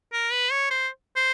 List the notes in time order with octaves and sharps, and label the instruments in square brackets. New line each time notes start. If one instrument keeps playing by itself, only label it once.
[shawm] A#4
B4
C#5
C5
C5